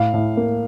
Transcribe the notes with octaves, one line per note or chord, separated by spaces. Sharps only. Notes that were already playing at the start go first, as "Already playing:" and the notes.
Already playing: A2 F5
A2
A#3